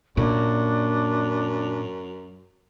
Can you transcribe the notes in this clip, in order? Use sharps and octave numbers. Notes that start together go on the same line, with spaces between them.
F#2 A#2 D4